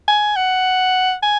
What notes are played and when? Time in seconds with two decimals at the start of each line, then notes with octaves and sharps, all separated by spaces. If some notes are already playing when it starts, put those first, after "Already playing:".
0.08 G#5
0.36 F#5
1.23 G#5